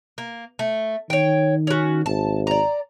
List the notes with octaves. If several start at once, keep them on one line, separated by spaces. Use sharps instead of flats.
A#3
A3
D#3 C#5 G5
C#4 F#4
G#1 A5
D5 A#5